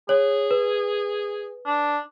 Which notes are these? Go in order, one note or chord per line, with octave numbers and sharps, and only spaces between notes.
G#4 C#5
B4
D4